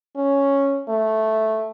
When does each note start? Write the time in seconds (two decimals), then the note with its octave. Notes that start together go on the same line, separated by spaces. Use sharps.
0.16 C#4
0.88 A3